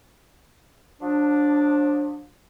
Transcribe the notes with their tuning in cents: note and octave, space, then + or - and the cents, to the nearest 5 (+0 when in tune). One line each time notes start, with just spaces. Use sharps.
F3 +40 D4 +0